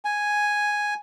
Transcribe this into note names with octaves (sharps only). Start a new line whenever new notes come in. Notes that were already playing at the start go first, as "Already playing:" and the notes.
G#5